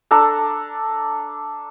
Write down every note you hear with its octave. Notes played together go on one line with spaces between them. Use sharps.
D4 A4 A#5